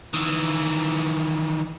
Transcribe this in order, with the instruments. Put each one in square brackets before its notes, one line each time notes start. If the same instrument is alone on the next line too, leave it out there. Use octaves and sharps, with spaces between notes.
[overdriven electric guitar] D#3 E3